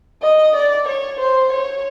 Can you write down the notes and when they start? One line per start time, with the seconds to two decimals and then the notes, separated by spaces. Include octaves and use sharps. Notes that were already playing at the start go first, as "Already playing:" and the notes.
0.22 D#5
0.55 D5
0.88 C#5
1.19 C5
1.52 C#5